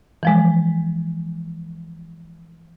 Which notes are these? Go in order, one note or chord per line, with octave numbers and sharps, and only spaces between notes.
E3 F3 G#3